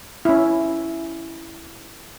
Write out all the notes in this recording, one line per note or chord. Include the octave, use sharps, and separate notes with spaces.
C#4 E4